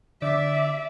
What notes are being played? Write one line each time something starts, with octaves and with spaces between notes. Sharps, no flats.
D3 D5 E5 D6 B6